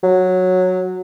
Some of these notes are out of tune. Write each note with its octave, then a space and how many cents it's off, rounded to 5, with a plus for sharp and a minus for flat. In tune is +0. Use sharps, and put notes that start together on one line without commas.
F#3 -10